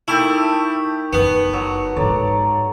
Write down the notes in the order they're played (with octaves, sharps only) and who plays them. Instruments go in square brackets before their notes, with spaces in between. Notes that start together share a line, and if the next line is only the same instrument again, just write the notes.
[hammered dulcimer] A3 G4 [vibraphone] D#4 A#4 [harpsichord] E4
[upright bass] F#1 F#2 [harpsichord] B3
[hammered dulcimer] F#3
[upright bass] G#2 D#4 [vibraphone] A4 C#5 A#5 [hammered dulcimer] D5